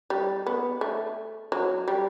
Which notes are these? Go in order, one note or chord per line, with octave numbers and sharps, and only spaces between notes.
G3
B3
A3
F#3
G3